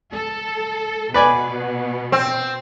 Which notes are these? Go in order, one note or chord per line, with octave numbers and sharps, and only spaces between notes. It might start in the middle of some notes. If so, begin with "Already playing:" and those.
A4
B2 B3 B4 D5 G#5
C4